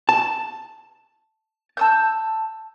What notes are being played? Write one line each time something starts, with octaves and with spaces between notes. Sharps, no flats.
A5
A5 E6 G6